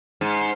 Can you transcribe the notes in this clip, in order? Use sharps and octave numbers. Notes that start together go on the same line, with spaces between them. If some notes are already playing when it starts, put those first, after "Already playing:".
G#2